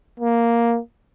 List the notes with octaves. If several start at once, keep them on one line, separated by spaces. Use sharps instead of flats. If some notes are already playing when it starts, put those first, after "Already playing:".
A#3